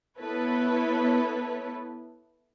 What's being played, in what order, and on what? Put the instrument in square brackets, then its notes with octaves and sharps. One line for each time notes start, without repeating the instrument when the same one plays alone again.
[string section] B3 E4 A4 B4 C#5